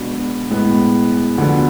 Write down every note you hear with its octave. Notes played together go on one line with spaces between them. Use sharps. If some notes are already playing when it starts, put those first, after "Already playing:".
Already playing: B2 G#3 B3 D4
A2 G#3 B3
D2 D3 F3 B3